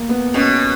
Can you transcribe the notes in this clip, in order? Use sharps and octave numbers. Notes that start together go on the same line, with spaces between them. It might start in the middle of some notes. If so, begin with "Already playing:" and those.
Already playing: A#3
B3
B2 C#4